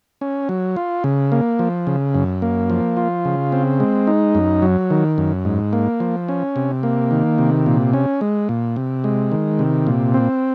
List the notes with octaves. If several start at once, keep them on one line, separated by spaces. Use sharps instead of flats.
C#4
F#3
F4
C#3
A#3
F3
C#3
F#2
A#3
F3
F4
C#3
C4
G#3
D#4
F#2
F#3
D#3
F#2
G#2
A#3
F3
C#4
C3
A#3
D#3
C3
A#2
C#4
G#3
A#2
C3
G#3
D#3
C3
A#2
C4